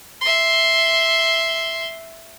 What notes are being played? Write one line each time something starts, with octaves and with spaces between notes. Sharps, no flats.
E5 C6